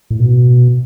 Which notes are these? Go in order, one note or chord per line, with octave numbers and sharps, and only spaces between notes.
A2
B2